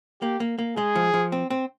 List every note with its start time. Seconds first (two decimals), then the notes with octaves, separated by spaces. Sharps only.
0.22 A#3 G4
0.40 A#3
0.58 A#3
0.77 G#3 G#4
0.96 F3
1.14 F3
1.32 C4
1.50 C4